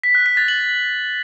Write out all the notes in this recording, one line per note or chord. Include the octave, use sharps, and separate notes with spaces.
B6
F#6
B6
A6
F#7